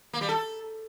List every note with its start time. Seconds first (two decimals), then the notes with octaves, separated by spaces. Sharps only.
0.13 A#3
0.21 G3
0.29 A4